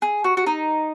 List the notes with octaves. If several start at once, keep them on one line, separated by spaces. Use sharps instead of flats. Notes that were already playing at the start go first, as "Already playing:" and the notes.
G#4
F#4
F#4
D#4